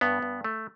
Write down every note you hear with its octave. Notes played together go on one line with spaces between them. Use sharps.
G2 B3
G2
A3